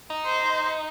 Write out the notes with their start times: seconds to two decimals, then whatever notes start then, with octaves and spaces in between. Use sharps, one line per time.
0.10 D#4
0.25 C5